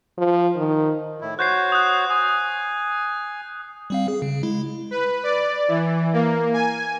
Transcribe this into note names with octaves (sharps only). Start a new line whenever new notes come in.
F3
D#3
A2 E4
F#4 C5 C#5 F#6 G6 C7
D#6 F#6
G#5 D#6
G3 C4 F5
G#4
C#3
G#3 E4
B4
D5
E3
A#3
G#5